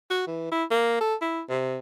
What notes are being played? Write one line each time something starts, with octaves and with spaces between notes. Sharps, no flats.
F#4
E3
E4
A#3
A4
E4
C3